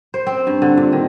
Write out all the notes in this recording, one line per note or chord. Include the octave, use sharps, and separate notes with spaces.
C5
C4
G2
D3
A#2
D#3